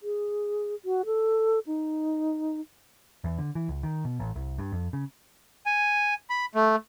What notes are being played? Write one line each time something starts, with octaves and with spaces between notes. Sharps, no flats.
G#4
F#4
A4
D#4
E2
D3
E3
C#2
D#3
B2
A1
C2
G2
F2
C#3
G#5
B5
A3